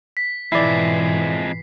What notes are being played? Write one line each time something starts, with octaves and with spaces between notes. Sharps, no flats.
B6
F2 G#2 B2 E3 G#3 E4 D5 C7